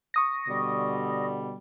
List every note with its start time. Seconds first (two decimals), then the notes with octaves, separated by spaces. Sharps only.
0.14 C#6 D#6 A#6
0.47 B2 D3 G3